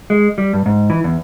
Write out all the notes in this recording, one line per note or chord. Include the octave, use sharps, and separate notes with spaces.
G#3
G3
G2
G#2
E3
E2